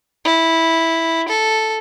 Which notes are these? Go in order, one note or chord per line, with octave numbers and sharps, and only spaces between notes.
E4
A4